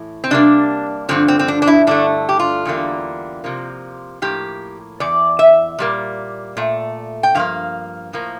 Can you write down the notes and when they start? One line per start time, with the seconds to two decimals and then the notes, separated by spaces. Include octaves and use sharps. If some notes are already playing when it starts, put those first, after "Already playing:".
Already playing: A2 E3
0.24 C4
0.31 C3 G3 A#3 D4
1.09 G2 D3 F3 C4
1.28 C4
1.39 C4
1.48 D4
1.62 D4
1.67 E4
1.87 G2 D3 A3 D4
2.29 G4
2.39 F4
2.65 E2 D3 G3 A#3
3.44 C3 F3 A#3
4.22 A2 F3 A#3 G4
5.00 E2 E3 D5
5.39 E5
5.79 A#2 G3 A#3
6.57 A#2 A3
7.23 G5
7.35 G2 F3 A#3 F5
8.13 A2 F3 A#3